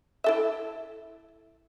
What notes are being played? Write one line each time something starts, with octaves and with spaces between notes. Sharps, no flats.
E4 A4 E5